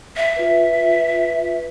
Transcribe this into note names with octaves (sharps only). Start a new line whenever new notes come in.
E5
F4 B4